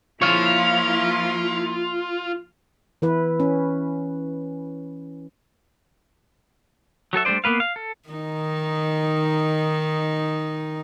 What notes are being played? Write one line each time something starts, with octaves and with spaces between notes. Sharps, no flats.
F3 A#3 E4 F4 C#5 F5
E3 E4 B4
C#4
F#3 F#4 A4 E5
G3 A3 D4 C5 D5
A#3 B3 B4 F5
F5
A4
D#3 D#4